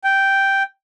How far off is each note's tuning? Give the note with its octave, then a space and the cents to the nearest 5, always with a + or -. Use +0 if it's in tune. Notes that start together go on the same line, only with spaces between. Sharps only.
G5 -5